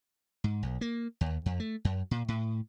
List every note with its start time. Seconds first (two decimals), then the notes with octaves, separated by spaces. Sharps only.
0.44 G#2
0.63 B1
0.81 A#3
1.21 D#2
1.46 F2
1.60 A3
1.85 F#2
2.11 A#2
2.28 A2